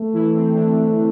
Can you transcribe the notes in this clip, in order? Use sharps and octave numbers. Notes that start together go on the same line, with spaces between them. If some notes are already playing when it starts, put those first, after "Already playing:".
Already playing: A3
E3 E4
C4
D3 D4